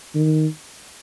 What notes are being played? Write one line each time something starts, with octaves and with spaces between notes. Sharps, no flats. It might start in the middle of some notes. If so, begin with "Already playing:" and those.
D#3